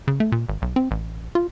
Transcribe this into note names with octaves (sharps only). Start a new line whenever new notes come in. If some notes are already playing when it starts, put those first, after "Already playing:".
C#3
A3
A#2
G#1
B1
C4
A1
F4